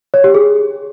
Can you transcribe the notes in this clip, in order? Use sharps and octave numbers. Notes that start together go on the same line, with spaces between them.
C#5
G4
G#4